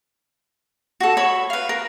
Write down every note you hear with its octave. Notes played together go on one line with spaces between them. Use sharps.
F#4 A4
C#5 B5 C#6
B4 F5
A#4